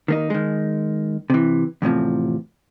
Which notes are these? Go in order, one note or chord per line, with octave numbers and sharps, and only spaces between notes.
D#3 A#3 D#4
D#3 G#3
C3 E3
E2 A2 C3 F3